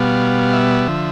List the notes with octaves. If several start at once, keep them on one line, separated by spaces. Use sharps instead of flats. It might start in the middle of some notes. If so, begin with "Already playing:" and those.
Already playing: B2 G3 B3 F5
E5
D3 F3